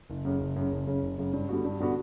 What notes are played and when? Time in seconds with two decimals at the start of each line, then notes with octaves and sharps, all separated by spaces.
0.10 F#1
0.25 F#2 C#3
0.41 F#1
0.56 F#2 C#3
0.72 F#1
0.87 F#2 C#3
1.03 F#1
1.18 F#2 C#3
1.33 G2
1.49 D3 G3 B3 F#4
1.65 G2
1.80 D3 G3 B3 F#4